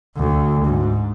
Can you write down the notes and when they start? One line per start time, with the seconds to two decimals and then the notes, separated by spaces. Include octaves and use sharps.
0.16 D2
0.65 G#2